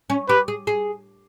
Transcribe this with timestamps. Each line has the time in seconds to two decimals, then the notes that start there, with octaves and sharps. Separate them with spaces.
0.10 C#4
0.29 G4 B4
0.48 G#4
0.67 G#4